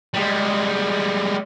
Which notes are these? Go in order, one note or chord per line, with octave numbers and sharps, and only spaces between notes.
G3 G#3